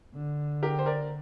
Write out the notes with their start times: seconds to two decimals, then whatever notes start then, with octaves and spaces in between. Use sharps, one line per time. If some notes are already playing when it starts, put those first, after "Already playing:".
0.14 D3
0.63 G4 A#4
0.79 C5
0.86 A#4 D5